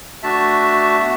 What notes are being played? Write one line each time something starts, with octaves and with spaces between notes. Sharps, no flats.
A3 D4 F#4 E5 A5
B3 F#4